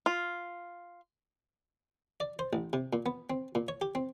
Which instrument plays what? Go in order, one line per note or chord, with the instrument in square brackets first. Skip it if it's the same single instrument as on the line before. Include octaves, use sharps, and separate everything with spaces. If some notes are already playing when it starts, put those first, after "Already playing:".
[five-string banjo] F4
[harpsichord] D5
C5
A1
C3
A#2
B3
C4
A#2
C#5
G4
C4